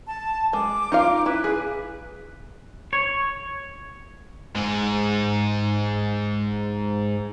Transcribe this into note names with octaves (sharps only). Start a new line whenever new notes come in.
A5
G#3 D6
D#4 F4 F5
E4 B4
G#4
C#5
G#2 G#3